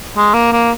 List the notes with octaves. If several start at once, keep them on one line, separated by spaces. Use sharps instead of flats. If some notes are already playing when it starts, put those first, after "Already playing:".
G#3
A#3
A#3